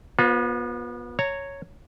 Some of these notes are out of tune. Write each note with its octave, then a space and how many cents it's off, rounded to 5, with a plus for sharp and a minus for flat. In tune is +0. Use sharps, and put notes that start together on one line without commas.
B3 -30 F4 +35 C5 +0
C#5 +0 A#5 -20